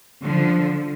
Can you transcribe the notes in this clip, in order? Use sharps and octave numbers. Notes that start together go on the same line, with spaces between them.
D3 F3